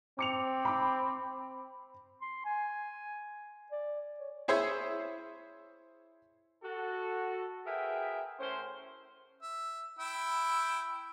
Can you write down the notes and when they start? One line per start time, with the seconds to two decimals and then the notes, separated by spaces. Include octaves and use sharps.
0.19 C4 D6 C#7 F7
0.65 B5 D6
2.22 C6
2.45 G#5
3.72 D5
4.20 C#5
4.48 E4 G#4 C5 C#5 E5
6.63 F#4 A4
7.66 F#4 G#4 A#4 B4 E5 G5
8.40 A2 C#4 A#4 C5
9.42 E5
9.99 E4 E5 G5